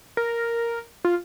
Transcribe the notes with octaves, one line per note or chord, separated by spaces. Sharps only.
A#4
F4